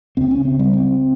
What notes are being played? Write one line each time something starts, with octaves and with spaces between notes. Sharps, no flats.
C#2 C#3 C4
C#4
C4
G3
C4